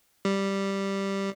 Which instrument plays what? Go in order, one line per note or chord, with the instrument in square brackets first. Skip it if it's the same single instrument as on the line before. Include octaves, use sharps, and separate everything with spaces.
[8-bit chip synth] G3